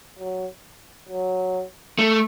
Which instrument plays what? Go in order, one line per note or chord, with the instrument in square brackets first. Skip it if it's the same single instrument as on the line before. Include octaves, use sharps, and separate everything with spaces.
[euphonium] F#3
F#3
[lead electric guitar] A3